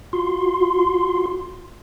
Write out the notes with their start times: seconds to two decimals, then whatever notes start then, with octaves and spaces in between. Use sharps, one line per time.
0.13 F4 F#4 C6